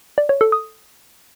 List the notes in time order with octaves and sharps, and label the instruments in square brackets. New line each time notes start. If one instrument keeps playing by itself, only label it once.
[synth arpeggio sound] D5
C#5
A4
D#6